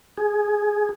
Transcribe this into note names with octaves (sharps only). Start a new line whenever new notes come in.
G#4